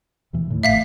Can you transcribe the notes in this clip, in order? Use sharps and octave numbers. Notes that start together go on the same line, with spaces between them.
D#2 B2 E3
A2 D#3 E3
G#1 A2 E5 F5 B6